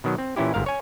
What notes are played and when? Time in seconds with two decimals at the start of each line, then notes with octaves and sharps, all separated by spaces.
0.04 B2 D#3 F#3
0.18 C4
0.36 A#2 E3 C#4 E4 G4
0.54 G1 G#2 A#4 F5
0.66 C#5 G#5